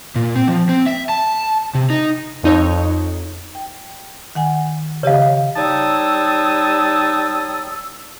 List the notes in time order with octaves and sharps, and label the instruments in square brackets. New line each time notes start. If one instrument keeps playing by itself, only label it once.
[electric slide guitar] A#2
C4
F3
C4
E5
A5
C3
D#4
[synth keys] F2 D#4 C#5
[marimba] G5
D#3 F#5 G#5
[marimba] C#3 G4 D#5 [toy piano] C#5 F5
[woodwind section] G3 D#4 C#5 A5 D#6 E6